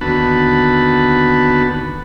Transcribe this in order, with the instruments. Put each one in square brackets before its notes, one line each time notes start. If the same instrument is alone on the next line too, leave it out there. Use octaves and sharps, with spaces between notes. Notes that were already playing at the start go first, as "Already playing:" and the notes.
[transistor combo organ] D#2 D3 B3 F#4 A5 B5